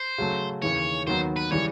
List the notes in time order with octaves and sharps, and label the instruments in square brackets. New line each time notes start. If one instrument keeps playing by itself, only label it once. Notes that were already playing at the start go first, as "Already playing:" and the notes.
Already playing: [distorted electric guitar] C5
[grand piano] C#3 F#3 A3
[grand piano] D#2 C#3 E3 [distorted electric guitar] C#5
[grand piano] D#2 D#3 F#3 B3 [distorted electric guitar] C5
[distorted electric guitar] B4
[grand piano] C#3 E3 G3 [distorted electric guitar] C#5